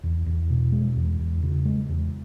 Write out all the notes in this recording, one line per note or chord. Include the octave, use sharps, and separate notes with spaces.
E2
E2
B2
G#3
E2
E2
C#3
G#3
E2